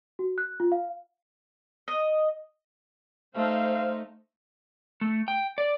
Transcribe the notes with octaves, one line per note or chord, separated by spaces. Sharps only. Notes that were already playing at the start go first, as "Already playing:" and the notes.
F#4
F#6
F4
F5
D#5
A3 D#4 C5 F5
A3
G5
D5